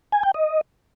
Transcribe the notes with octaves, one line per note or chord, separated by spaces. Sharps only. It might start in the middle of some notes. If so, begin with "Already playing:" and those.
G#5
G5
D#5